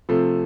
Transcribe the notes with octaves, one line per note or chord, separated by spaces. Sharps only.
C3 F3 A3